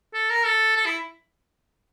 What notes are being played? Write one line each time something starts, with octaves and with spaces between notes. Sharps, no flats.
A4
A#4
A4
A4
E4